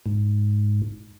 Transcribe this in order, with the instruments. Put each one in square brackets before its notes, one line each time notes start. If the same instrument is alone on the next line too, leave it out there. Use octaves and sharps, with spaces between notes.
[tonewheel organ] G#2